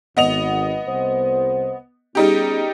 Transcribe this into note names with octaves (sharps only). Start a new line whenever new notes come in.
G#1 B3 D#5 F7
C2 C5
G3 B3 C#4 D#4 G4 G#4